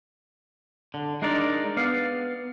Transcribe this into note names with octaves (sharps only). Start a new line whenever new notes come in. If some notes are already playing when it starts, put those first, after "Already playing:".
D3
G#3 D4 D#4 A#4 D5
B3 D5 F5